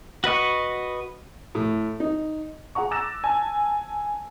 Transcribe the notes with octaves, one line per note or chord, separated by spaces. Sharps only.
F#4 B4 D#5 C#6
A2
D#4
G#4 F#5 A#5 C#6
D6 E6 F#6 A6 A#6 E7
G#5 A5 E6